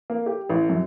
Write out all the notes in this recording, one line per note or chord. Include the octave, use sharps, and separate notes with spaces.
A#3
G4
A1
F#2